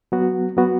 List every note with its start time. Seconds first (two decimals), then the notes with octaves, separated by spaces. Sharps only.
0.12 F#3 B3 F#4
0.57 F#3 B3 F#4